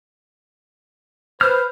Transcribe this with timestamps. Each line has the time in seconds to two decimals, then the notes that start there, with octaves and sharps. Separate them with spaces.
1.41 B4 C5 F6